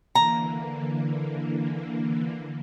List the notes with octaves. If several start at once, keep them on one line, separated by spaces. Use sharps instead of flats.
D3 E3 A#3 A#5